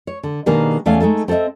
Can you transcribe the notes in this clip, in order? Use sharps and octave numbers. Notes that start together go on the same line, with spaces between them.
C#5
D3
B2 D#3 A#3 D4 G4 G#4
E2 A3 C#4 D5 F5 G#5
G#3 A3 D#4 A4
C4 A4 C5 D#5 E5